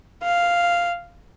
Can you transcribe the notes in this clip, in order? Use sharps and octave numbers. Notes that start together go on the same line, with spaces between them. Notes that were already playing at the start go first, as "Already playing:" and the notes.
F5